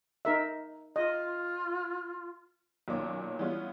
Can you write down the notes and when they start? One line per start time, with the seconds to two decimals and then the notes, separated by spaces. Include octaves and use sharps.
0.25 D#4 A#4 E5
0.96 F4 D#5
2.88 B1 A#2 D#3 C#4 D6
3.39 E3 G3 G#3 B3 C#4 F4